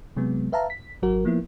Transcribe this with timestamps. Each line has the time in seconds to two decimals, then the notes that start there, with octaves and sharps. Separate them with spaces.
0.17 C3 F#3 G#3 B3
0.52 B4 E5 F5 A5 A#5
0.70 B6
1.02 G#1 F#3 F#4 A#4
1.25 F3 A#3 B3 E4